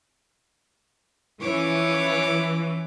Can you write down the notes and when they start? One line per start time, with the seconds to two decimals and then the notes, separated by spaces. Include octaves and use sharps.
1.41 E3 F3 C#4 C#5 D6